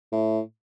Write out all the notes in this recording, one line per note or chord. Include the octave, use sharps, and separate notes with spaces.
A2